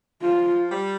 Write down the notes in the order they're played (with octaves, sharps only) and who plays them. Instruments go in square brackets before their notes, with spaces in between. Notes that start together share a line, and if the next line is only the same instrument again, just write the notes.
[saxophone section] F3 [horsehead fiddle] F4
[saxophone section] G3